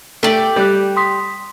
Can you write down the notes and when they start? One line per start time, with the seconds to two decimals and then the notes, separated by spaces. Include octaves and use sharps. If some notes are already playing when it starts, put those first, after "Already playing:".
0.23 A3 G4 D5
0.56 G3 A4 F#6
0.96 C6 D#6 B6